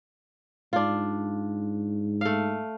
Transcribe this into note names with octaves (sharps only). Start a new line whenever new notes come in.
G#2 D4 F4
A3 F5